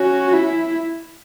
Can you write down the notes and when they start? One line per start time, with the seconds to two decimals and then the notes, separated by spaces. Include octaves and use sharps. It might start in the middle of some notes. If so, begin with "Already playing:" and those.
Already playing: C#4 F#4
0.33 E4